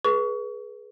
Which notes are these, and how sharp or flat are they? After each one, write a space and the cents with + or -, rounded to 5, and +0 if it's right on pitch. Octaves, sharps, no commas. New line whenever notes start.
G#4 +20 B4 -20 C#6 +30